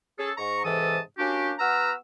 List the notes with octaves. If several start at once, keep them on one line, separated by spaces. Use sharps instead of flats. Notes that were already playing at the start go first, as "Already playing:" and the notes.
C#4 G#4 A4
G#2 A#5 C#6
G#2 C3 E3 A4 A5 D#6
A#3 C#4 D4 F#4 G4
B3 F#4 B4 A#5 E6 F6